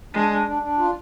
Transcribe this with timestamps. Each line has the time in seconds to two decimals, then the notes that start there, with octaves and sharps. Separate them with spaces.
0.14 G#3 D4
0.31 D4
0.47 D4
0.62 D4
0.78 F4